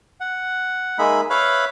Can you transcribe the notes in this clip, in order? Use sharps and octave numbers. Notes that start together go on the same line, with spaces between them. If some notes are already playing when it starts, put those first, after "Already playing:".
F#5
G#3 A#3 D#4 G#4 E5 B5
B4 C#5 E5 F5 B5 F6